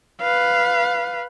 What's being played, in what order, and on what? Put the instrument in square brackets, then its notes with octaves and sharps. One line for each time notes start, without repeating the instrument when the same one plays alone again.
[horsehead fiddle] B4 F5